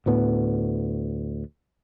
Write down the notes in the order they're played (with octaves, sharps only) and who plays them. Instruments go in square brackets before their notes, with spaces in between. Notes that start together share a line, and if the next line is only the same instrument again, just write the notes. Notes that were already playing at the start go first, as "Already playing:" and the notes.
[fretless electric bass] D2 A2 B3